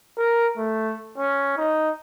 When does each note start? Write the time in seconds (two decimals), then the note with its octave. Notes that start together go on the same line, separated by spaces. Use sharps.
0.18 A#4
0.58 A3
1.18 C#4
1.57 D#4